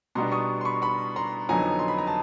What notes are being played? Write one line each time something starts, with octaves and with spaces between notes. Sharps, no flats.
B2 G3 B3 D4 A#5 C6
C#6 D#6
C6
B5 C#6
B5 C#6
A#5 C6
F2 D3 F#3 B3 D#4 G#5 A#5
C6
B5
A#5
A5